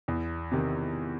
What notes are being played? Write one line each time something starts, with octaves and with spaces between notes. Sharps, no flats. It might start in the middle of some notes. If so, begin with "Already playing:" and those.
E2
C3 D#3